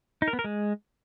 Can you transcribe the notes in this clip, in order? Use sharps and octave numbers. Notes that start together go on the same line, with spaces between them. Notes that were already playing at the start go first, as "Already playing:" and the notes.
D#4
A#4
B3
A#4
G#3